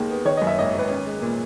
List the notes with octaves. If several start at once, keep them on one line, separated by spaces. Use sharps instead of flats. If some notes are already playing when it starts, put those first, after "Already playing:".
Already playing: D#2 D#3 G#3
B3
D#3 C#5
F#2 D#5
E5
G#1 D#5
G#1 B4
C#4
G#3
A#2